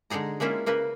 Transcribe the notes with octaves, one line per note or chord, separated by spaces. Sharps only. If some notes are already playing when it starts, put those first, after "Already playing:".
D3 G#3 D#4 G#4 A#5
G#3 A#3 C#4 E4 F4
C#3 A#3 A#4 B4